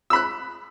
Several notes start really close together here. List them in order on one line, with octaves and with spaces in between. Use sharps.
E6 B5 F#6